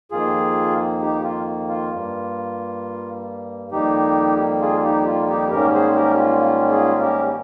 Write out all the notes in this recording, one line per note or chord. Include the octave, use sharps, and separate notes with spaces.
F2 D#3 A#3 F4 G#4
D#4 G4
F4
F4
G2 G3 A#3
F2 D#3 G3 A#3 D#4 G4
F4 G#4
D#4 G4
F4
D#4 G4
G#2 D#3 G3 A#3 C#4 G4 A#4
G#4 C5
G4 A#4
F4
F4
F4 G#4
G4 A#4